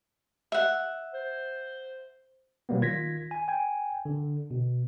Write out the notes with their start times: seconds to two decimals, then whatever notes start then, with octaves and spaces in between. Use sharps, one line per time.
0.52 E5 F#5
1.14 C5
2.69 B2 F#3 G3 A#3 B3
2.81 D#3 F4 G#6 A#6 B6
3.31 G#5
3.48 G5 G#5
4.05 D3
4.51 B2